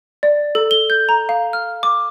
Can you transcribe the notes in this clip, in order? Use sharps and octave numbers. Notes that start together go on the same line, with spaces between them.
D5
A4
G7
G6
A#5
F5
F6
D6